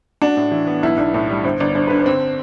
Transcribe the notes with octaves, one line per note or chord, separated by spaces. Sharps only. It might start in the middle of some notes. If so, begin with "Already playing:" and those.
D4 F#4
A2
E3
B3
B1 E4
B1 D4
A2 D4
G3
G1 C5
G1 D5
G2 C5
D3 B4
C5
C4